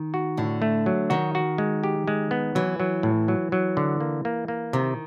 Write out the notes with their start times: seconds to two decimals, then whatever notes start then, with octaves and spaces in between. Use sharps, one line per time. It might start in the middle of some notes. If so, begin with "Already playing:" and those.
Already playing: D#3
0.14 F#4
0.37 A2 D3
0.62 A3
0.86 F#3
1.10 D#3 F#4
1.35 F#4
1.58 G#3
1.84 G4
2.08 G#3
2.31 B3
2.55 E3 F#3
2.80 F#3
3.03 A2
3.28 F#3
3.52 F#3
3.77 D3
4.01 A#3
4.25 A#3
4.48 A#3
4.73 C3 D#3